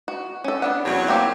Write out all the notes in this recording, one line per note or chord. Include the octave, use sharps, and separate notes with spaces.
F#4
C#4 A4
B3 D4 F#5
E2 C3 F#3 C#5
A#3 C4 G4